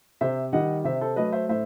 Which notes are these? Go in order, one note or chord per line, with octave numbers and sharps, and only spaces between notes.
C3 C5 E5
D#3 G3 D#5 F#5
C3 C5 E5
A4 C5
F#3 A3 B4 D#5
C5 E5
A2 C5 E5